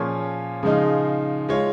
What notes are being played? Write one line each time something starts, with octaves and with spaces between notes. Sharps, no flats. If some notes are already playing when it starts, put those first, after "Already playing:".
Already playing: A#2 F3 C#4 G#4 C#5
C#3 F3 G#3 D#4
G#3 F4 C#5